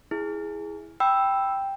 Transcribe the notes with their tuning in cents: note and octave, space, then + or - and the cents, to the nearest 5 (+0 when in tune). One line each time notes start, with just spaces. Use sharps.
E4 -5 G#4 +0
G5 +0 B5 +0 E6 +0